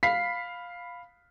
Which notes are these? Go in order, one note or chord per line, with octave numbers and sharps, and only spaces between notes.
F5 B5 B6 C7